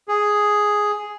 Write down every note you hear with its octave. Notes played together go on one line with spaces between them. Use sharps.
G#4